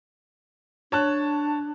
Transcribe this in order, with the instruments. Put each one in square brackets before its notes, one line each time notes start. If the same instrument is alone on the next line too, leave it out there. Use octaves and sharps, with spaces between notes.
[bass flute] D4 [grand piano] C#5 A5 F#6